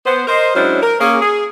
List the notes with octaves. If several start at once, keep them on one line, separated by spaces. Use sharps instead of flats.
B3 C5
A#4 C5 D#5
F#3 G#3 C#4 D4 E4 C5
A#4
A#3 C#4 G#4
G#4